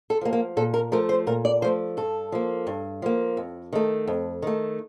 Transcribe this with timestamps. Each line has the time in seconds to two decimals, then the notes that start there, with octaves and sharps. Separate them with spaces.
0.10 A4
0.21 F3 A#3
0.33 A#3
0.57 A#2 A4
0.74 A#4
0.92 F3 A3 A#4
1.09 C5
1.27 A#2 A#4
1.45 D5
1.62 F3 A3 C5
1.97 G2 A4
2.32 F3 A#3
2.67 G2
3.02 F3 A#3
3.37 F2
3.73 D#3 A3
4.07 F2
4.42 D#3 A3